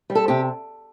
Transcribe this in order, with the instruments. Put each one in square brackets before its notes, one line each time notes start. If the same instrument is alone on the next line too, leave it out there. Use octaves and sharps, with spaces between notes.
[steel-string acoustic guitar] G3
A4
C3 G4